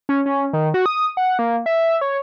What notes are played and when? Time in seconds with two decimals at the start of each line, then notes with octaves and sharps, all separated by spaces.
0.09 C#4
0.26 C#4
0.53 D#3
0.74 F#4
0.86 D#6
1.17 F#5
1.39 A#3
1.66 E5
2.01 C#5